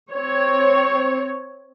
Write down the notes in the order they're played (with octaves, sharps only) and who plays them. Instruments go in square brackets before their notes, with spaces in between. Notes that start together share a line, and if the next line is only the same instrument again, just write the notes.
[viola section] C4 C#5